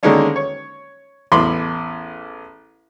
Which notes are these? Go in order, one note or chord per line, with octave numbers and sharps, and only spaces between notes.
D3 D#3 G#3 A#3 C#4 D4
C#5
A1 E2 B5 C6 D6